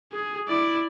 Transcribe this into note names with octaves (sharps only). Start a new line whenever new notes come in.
G#4
E4 D5